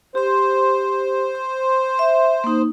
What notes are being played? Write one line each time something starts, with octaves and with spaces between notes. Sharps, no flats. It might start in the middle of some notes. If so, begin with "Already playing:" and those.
G4 C5 C6
C6
E5
A#3 D#4